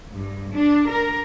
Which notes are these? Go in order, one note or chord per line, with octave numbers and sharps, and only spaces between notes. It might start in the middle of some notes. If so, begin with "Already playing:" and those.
G2
D4
A#4